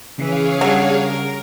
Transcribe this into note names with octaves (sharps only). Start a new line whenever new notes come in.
C#3 E3 G#4 C#5 F5
F#3 G3 D4
A#4